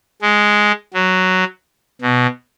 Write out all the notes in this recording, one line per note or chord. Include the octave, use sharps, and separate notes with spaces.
G#3
F#3
B2